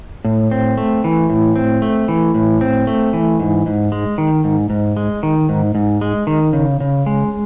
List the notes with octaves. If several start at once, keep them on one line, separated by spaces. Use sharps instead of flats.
A2
C4
A3
E3
A2
C4
A3
E3
A2
C4
A3
E3
G#2
G#2
G#3
D#3
G#2
G#2
G#3
D#3
G#2
G#2
G#3
D#3
C#3
C#3
G#3